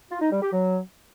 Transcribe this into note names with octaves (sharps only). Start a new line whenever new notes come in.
F4
D#4
G3
G4
F#3